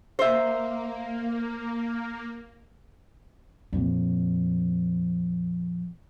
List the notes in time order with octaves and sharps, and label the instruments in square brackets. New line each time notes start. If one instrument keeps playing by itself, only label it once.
[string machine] A#3 [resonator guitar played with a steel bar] C5 E5
[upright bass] F2 A#2